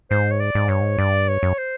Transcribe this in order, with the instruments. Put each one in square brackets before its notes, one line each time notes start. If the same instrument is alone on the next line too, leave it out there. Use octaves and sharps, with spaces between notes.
[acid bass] G#2 [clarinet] C5
[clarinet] C#5
D5
[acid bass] G#2
[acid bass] G2 [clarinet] C#5
[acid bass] G#2
[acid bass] G2 [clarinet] D5
[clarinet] C#5
[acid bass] F#2
[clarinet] C5